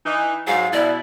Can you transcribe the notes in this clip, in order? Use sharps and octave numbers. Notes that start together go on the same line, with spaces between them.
E3 D#4
G#2 F#3 F5
B2 E4 D5